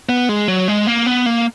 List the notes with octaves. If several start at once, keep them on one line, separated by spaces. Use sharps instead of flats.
B3
G#3
F#3
G#3
A#3
B3
A#3